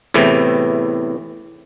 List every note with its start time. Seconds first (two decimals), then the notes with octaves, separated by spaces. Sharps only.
0.14 E2 A2 C3 E3